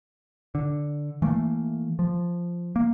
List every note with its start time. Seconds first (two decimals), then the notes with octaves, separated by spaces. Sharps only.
0.55 D3
1.22 E3 A3 A#3
1.99 F3
2.76 A#3